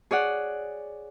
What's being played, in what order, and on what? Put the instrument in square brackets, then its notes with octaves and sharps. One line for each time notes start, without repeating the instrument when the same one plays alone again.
[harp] G#4 C#5 D5 F#5